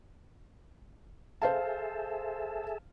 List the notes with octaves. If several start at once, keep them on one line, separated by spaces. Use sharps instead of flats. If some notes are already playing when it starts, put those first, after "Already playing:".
G#4 A4 C5 E5 F5 A5